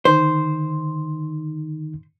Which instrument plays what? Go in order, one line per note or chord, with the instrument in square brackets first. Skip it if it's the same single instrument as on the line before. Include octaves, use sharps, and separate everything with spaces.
[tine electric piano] D3 D#3 D#4 [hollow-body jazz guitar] C5